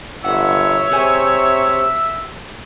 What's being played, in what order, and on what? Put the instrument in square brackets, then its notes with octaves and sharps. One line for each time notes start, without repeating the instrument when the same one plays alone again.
[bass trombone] G1 [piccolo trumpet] C#5 [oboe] E5 [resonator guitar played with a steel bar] F#5
[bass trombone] C3 [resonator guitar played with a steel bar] G#4 C5 G#5